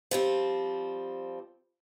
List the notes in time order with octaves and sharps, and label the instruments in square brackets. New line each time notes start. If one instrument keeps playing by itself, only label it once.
[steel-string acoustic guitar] F3 G3 C4